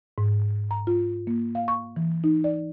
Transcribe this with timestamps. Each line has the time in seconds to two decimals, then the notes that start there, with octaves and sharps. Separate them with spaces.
0.18 G#2
0.71 A#5
0.87 F4
1.27 A#3
1.55 F5
1.68 C#6
1.96 E3
2.24 D#4
2.44 D5